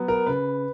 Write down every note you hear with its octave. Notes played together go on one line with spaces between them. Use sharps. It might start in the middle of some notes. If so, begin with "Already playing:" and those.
Already playing: F#3 B3
A#4
C#3 B4